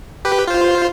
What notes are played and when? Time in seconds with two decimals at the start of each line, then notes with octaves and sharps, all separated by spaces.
0.25 G4 B4
0.47 F4 C5